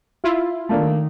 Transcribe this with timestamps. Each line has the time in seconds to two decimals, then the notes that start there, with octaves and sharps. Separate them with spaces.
0.24 E4 F4
0.69 D#3 A3 A#3 D4